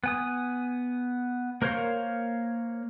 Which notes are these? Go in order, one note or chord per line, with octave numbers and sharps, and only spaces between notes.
B3 G#5 D#6
A#3 A#4 C5 C#5 F5